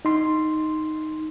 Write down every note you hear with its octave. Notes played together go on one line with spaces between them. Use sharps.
D#4 C6